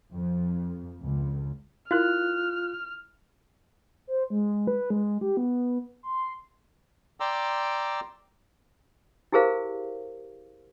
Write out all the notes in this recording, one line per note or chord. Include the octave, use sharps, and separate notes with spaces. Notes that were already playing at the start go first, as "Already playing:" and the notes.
F2
C#2
E4 F4 A#4 F6 F#6
C5
G#3
B4
G#3
G4
B3
C6
D5 G5 A#5 C6 D6 E6
E4 G4 G#4 A#4 C5 F5